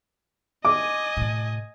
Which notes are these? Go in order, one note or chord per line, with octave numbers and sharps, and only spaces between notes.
D#5 G#5 D6
A2 C3